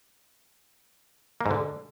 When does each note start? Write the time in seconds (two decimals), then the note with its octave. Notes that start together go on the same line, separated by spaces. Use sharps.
1.41 A#3
1.46 G#2
1.51 D3